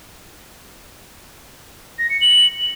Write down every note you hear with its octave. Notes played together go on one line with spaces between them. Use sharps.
A#6
C#7
F#7